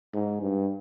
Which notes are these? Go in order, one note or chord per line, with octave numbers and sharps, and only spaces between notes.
G#2
G2